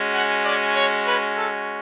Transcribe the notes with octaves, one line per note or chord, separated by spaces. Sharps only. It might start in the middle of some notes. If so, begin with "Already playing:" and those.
Already playing: G#3 C#4 F#4
F#5
D5
C#5
B4
A4